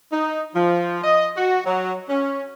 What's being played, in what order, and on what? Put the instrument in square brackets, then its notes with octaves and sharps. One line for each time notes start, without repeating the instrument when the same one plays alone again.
[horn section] D#4
F3
D#5
F#4
F#3
C#4